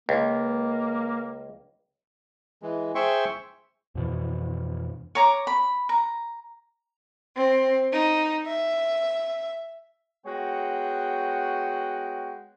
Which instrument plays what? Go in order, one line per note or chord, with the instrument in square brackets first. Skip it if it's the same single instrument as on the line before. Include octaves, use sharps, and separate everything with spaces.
[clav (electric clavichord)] C#2 [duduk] A#3
[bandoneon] E3 G#3
G#4 C5 E5 G5 C6 C#6
[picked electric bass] F2 B2 E3
[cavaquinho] C#5 A#5 D6
B5
A#5
[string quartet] C4
D#4
E5
[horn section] G#3 B3 F#4 C#5 F#5 G5